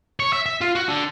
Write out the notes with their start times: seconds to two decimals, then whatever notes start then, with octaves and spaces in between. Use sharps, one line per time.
0.20 C#5
0.33 E5
0.46 E5
0.61 F4
0.75 F#4
0.88 D3